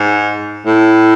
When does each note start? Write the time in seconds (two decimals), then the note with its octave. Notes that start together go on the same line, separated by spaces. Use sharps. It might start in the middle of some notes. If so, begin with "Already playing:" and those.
Already playing: G#2
0.66 A2